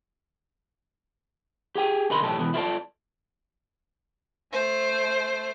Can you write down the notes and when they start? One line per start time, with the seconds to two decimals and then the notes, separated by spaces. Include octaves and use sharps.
1.75 G4 G#4 G5 G#5
2.10 B1 D3 A#4 D#5 B5 C6
2.23 B1 E2 A2 G4 A4 A5
2.39 B2 E3 B3
2.54 E4 F4 A4 B4 D5 A5
4.53 A3 C5